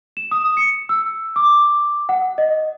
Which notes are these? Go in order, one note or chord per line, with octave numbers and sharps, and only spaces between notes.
E7
D#6
C#7
E6
D6
F#5
D#5